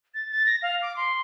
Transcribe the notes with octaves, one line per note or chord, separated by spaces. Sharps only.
A6
A6
A#6
F5
D6
C6